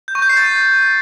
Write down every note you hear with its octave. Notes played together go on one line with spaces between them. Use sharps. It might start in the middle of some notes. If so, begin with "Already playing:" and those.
G6
C#6
G6
C7
A6